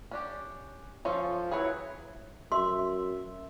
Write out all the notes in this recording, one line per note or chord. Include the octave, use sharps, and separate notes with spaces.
C#4 D4 G4
F3 C#4 F4 A4
E3 F#3 G#4 B4 C#5
F#2 E5 C6